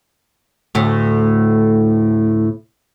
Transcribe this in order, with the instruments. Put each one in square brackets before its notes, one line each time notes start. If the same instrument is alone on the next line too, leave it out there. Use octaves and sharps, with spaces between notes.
[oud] D2 A2